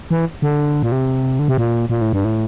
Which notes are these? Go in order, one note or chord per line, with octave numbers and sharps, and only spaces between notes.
E3
D3
A#2
C3
D3
C3
A#2
A#2
A2
G2
A2